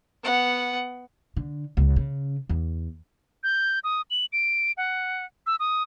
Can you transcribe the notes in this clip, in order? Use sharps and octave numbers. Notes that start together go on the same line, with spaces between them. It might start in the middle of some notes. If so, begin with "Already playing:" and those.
B3 F#5
D3
C#2
C#3
E2
G6
D#6
F#7
D7
F#5
E6
D#6